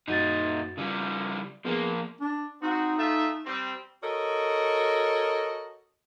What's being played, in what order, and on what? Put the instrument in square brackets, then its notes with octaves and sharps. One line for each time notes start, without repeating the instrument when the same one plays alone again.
[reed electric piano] F#2 F#4 A6 [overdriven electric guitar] A#2 D#4
[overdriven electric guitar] C#3 G3 [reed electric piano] F4
[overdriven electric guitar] F3 A#3 [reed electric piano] B3 G#4
[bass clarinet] D4
[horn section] C4 F#4 [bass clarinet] D#4
[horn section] A3 F4 E5
G3 C4
[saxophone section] F#4 A4 A#4 C#5 D#5